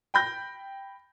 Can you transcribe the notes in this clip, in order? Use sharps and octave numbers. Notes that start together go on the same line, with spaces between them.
G5 B5 G6 A#6